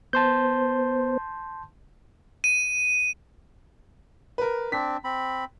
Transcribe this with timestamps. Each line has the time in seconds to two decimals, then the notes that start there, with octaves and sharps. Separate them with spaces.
0.13 B3 C5 A5 C6 G6
2.44 D#7
4.38 A#4 B4
4.72 C4 D4 B6
5.04 C4 B5